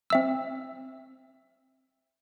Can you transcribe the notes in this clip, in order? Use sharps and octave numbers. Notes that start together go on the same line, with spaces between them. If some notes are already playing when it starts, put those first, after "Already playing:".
C4 E5 E6